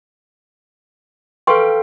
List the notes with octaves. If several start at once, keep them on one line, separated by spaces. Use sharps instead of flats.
A4 B4 F5 G5 C6 C#6